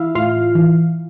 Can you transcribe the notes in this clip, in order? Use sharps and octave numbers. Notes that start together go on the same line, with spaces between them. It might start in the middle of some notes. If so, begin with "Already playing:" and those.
Already playing: E3 E4 E5 F5
A2 F4 F5
E3